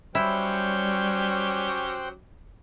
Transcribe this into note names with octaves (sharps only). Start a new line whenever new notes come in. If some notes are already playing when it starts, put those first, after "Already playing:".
F#3 G3 C#4 E4 G4 C5 G5 F#6